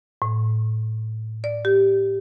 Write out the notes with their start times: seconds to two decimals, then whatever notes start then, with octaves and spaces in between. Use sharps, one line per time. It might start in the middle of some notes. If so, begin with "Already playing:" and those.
0.22 A2
1.44 D5
1.65 G4